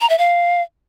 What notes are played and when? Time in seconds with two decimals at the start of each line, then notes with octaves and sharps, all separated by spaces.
0.01 A#5
0.10 E5
0.18 F5